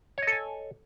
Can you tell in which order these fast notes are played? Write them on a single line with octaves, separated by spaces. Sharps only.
C#5 D#5 A4 G#5